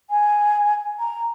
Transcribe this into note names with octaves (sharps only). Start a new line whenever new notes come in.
G#5
A#5